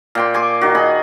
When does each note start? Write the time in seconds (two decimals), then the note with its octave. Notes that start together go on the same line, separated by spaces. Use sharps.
0.15 A#2 G5 C6
0.34 G#5 C6 D6
0.61 D#3 F#4
0.75 G#4 D#5 B5